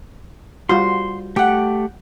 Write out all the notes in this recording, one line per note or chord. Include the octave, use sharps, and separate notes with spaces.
G3 F4 F#4 C5 C6
A3 G4 F#5 G5